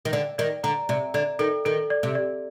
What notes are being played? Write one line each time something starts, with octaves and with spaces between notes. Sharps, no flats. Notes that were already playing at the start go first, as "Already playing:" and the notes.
D#3
D3 D5
D#3 D5
D3 A#5
C3 D5
D3 D5
D#3 A4
D#3 A4
D5
C3
D5